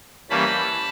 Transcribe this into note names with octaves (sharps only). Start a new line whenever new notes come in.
E3 G3 A#3 C#4 A5 B5